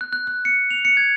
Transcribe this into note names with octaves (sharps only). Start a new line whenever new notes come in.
F#6
F#6
F#6
C#7
F7
C#7
G#6